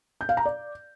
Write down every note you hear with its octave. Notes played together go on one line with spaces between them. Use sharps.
G6
F5
A#5
D5